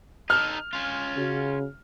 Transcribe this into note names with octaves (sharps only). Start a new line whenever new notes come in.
D#4 A4 F6
C#4 F4
C#3 F#4